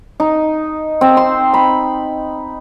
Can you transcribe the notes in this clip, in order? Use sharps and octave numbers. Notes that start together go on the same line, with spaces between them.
D#4
C4
C6
B5